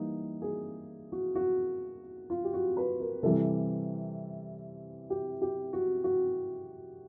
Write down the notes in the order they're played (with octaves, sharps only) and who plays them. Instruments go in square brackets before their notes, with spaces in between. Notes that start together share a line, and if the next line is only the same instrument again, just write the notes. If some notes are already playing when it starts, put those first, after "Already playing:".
Already playing: [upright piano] E3 G3 A#3 D#4
G#4
F#4
F#4
F4
G4
F#4
B4
A#4
C3 E3 G3 A4
G4
G4
F#4
F#4